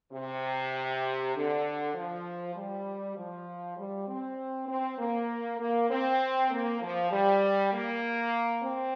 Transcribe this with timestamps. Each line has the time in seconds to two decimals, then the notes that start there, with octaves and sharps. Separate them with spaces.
0.12 C3
1.35 D3
1.94 F3
2.55 G3
3.17 F3
3.77 G3
4.07 C4
4.68 C4
4.98 A#3
5.59 A#3
5.89 C4
6.50 A#3
6.80 F3
7.11 G3
7.72 A#3
8.63 C4